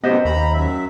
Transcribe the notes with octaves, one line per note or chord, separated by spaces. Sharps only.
F#2 A2 C3 B3 G4 C5 D#5
D#2 A#5 B5
F#2 F#3 E5